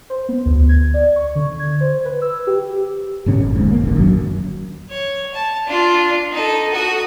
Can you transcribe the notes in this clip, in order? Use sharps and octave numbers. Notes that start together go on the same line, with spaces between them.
C5
B3
D2
G#6
D5
C#6
D3
G#6
C5
B4
E6
G4
G#2 B2 D3 C#4
F#1
D#2 G#2
A#1 A#3
D#1 A1 D3
F#2 D#3 F#3
C#5
A5
D4 F4
D#4 A4
F#4 D#6